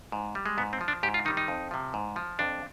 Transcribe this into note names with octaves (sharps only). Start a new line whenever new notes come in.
G#2
G3
G#3
G#2 B3
C4
F3
D4
G#2 G4
F4
D#3 G3 D#4
D#4
F2
C3 F3
G#2
F3
F2 D4